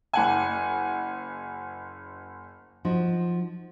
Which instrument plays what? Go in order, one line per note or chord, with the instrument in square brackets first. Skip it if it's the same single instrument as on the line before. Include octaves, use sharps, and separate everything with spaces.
[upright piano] F#1 F#5 G#5
[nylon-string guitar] F3 D#4 F#4